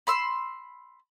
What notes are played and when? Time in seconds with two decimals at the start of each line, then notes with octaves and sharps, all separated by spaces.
0.07 B5 C6 E6